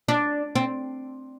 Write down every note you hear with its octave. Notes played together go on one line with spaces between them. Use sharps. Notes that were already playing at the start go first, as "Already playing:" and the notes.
D4
C4